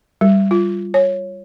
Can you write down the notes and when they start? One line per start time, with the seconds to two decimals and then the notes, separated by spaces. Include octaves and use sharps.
0.21 G3
0.51 F4
0.94 C#5